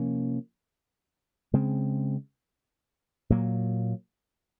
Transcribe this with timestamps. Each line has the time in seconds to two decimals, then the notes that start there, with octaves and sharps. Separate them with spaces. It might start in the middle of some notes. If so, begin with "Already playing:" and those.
Already playing: C3 F3 A#3 C#4
1.53 C#3 G#3 C4
3.30 A#2 F#3 A#3